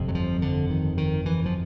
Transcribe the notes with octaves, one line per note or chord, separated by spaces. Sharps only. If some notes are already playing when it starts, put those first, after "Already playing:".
Already playing: G1 F2 C3
F#3
F3
D3
D#3
D#3
E3
F3